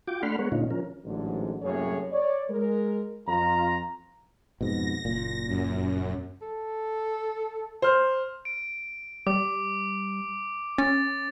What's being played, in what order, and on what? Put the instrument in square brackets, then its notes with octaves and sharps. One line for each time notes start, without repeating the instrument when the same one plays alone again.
[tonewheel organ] F4 F#4 G5 D6
A3 D4 F#5 B5 C6 F6
G#3 B3 A#4 C#5 F#5
A#2 D3 C#4 D#4 F4
F3 C#4 A#4
[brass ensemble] A1 G#2 D3 F#3
C2 F#2 A2 A#3 G#4 C#5
C#5 D5
G#3 A#4
F2 F4 A#5
[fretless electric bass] F2 G#2 B2 [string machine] A#6
[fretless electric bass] F#1 A#2
[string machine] F#2
[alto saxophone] A4
[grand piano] C5 F6
[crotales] D7
[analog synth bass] G3 [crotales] D6
[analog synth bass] C#4 [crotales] A6